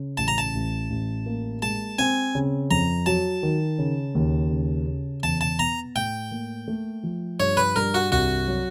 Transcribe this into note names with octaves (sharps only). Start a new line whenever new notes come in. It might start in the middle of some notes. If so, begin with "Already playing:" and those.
Already playing: C#3
A1 A5
A#5
A5
A1
A1
A#3
G#3 A5
C4 G#5
C#3
F2 A#5
F#3 A5
D#3
C#3
D#2
C#3
C#3
E2 A5
A5
B3 A#5
A2 G5
A#3
A3
F3
G2 C#5
B4
G2 A#4
F#4
C2 F#4
F#3